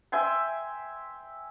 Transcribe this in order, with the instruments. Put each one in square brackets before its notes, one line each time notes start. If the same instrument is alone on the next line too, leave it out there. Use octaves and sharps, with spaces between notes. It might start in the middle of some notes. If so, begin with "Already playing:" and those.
[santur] E5 G5 G#5 C6